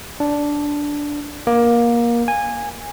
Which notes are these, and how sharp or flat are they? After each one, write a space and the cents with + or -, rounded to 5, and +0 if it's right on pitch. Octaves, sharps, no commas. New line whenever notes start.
D4 -5
A#3 +20
G#5 -15